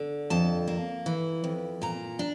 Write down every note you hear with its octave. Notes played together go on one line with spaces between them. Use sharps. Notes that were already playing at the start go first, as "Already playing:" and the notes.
Already playing: D3
F2 A5
A#3
E3
F2
A#2 A#5
D4